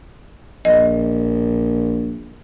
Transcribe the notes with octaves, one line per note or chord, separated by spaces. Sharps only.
A#1 D#5